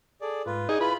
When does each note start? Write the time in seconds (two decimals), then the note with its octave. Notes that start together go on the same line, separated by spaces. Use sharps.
0.21 G#4 A4 D5
0.46 G#2 F4 B4
0.69 D#4 G#4 D5
0.81 E4 F4 B4 B5